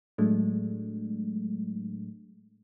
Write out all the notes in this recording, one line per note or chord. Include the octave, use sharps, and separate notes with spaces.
A2 F#3 G#3 A3 D4